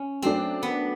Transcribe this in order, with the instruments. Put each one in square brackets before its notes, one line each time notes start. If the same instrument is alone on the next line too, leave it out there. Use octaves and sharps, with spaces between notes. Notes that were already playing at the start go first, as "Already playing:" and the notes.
Already playing: [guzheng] C#4
[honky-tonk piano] F#3 A3 D4 [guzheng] C4
[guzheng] B3